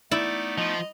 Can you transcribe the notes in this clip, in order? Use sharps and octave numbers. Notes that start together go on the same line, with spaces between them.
A3 B3 D#4 E4 D5
F3 D#5